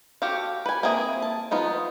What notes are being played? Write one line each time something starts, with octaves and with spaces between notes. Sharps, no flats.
F#4 G4 A4 F5
B4 G#5
A#3 C4 G#4 E5
A5
F3 B3 D#4 F4